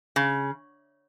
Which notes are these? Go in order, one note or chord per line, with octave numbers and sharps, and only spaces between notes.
C#3